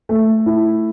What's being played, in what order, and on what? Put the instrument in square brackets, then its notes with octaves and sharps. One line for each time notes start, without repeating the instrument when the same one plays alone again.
[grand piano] A3
E4